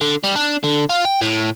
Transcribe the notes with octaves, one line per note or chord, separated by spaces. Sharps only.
D3
G3
D4
D3
F4
G5
A2